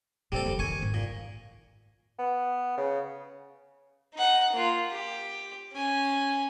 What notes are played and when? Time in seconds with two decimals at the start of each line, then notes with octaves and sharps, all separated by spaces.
0.32 F2 A#2 G3 C4 A4
0.46 F1
0.59 D#3 G#5 C#6
0.83 G#1
0.94 A#2
2.19 B3
2.78 C#3
4.14 D#4 F#5
4.52 A#3 F4
4.91 G4
5.72 C#4 G#5